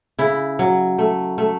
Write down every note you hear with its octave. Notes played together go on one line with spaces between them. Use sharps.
C#3 E4
F#3
A3
A3